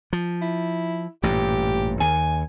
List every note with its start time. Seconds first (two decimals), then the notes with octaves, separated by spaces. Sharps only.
0.13 F3
0.42 E4
1.23 A1 G2 A#2 G4
2.00 D#2 G#5